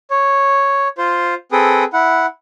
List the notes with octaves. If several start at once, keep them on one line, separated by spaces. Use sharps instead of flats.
C#5
F4 C5
C4 G#4 A4 B4 G5 D#6
E4 F#5